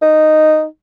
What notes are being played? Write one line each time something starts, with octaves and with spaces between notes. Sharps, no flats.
D#4